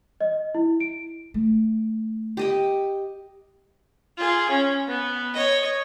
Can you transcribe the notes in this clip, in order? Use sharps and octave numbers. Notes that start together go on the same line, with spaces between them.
D#5
E4
D7
A3
G4 D#5 G5
F4 G#4
C#4
B3
C#5 D#5